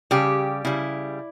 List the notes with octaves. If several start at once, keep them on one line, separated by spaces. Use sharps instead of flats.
C#3 G3 G4
C#3 G3 E4